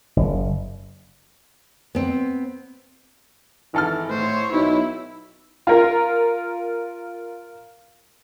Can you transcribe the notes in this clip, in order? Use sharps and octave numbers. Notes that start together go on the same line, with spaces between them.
F#1
B3 C4
G#1 E3 A4 F6
A2 C5 C#5
B1 E4
F4 A#4